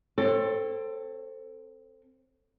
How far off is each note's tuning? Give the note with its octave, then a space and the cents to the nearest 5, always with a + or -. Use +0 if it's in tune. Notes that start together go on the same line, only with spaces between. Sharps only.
C4 +0 A4 +20 C#5 -25